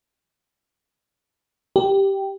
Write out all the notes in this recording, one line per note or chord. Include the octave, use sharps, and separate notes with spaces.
G4